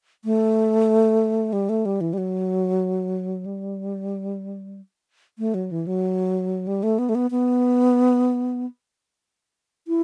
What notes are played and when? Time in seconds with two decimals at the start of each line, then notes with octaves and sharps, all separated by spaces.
0.25 A3
1.53 G3
1.69 A3
1.85 G3
2.01 E3
2.13 G3
2.18 F#3
3.46 G3
5.39 A3
5.54 F#3
5.71 E3
5.87 F#3
6.67 G3
6.83 A3
6.99 B3
7.09 A3
7.15 B3
7.31 B3
9.88 E4